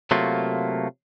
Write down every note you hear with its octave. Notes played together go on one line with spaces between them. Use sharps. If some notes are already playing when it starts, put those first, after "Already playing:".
C3 F#3 A3 A#3 F4